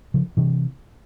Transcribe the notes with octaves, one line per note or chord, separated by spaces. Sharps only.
C#3 F3
C3 E3